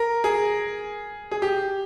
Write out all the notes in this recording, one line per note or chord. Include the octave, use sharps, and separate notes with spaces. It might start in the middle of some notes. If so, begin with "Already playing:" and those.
Already playing: A#4
G#4
G#4
G4